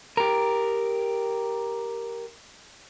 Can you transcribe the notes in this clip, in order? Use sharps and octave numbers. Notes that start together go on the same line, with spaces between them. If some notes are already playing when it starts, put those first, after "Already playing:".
G4 A#4